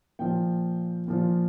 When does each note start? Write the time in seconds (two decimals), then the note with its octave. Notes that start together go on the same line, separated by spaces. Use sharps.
0.19 A#2 F3 G5
1.08 A#2 F3